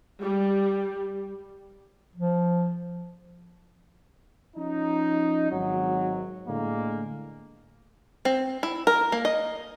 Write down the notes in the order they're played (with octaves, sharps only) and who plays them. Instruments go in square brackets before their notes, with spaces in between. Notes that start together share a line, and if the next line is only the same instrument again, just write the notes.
[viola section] G3
[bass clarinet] F3
[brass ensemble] F3 C#4 D#4
G#1 F#3
A2 D3 G#3 A#3
[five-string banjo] C4
E4
A#4
A#3
D#5